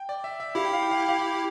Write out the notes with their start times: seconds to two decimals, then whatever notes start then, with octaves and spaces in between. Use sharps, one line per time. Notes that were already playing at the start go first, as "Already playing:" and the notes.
Already playing: G5
0.09 D5
0.24 E5
0.40 E5
0.55 E4 G4 F5
0.65 G5
0.73 F5
0.82 G5
0.91 F5
1.00 G5
1.09 F5
1.19 G5